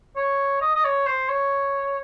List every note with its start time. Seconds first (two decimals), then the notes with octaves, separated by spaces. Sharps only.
0.16 C#5
0.61 D#5
0.75 D#5
0.85 C#5
1.07 C5
1.29 C#5